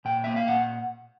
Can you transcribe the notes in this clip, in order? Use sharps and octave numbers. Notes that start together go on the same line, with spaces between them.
A#2 G5
A#3 E5
F5
A#2 F#5